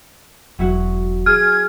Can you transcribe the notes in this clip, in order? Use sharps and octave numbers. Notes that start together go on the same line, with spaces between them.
E1 E3 F#3 E4 F#4
G#4 F6 G#6